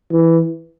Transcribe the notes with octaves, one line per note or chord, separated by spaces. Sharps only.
E3